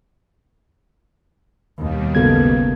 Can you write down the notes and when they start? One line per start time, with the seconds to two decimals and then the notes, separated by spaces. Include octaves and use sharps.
1.78 D#2 B2 D#3 G3
2.15 G#1 C#3 A#3 B3 A4 G#6